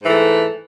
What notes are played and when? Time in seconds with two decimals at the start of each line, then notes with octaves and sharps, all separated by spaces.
0.02 G#2
0.04 E3
0.07 A3